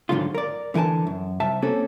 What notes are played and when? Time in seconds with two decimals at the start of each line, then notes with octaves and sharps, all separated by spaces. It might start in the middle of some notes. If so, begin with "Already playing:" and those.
0.09 G#2 D3 D#3 F#3 G#3 F4
0.35 A#4 D5
0.74 D3 E3 A#4 G#5 A5
1.07 F#2
1.40 C2 E5 A5
1.62 A#3 C4 C#4 F#4 A4